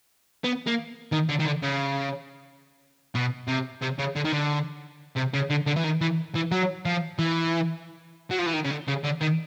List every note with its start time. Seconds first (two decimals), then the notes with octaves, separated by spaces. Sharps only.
0.44 B3
0.67 A#3
1.12 D#3
1.29 D3
1.39 D#3
1.45 D3
1.62 C#3
3.15 B2
3.47 C3
3.81 C3
3.98 C#3
4.15 D3
4.25 D#3
4.32 D3
5.16 C3
5.34 C#3
5.50 D3
5.67 D3
5.76 E3
5.84 D#3
6.01 E3
6.35 E3
6.51 F#3
6.86 F3
7.19 E3
8.31 F#3
8.39 F3
8.46 E3
8.54 D#3
8.64 C#3
8.71 D3
8.88 C#3
9.04 D3
9.21 D#3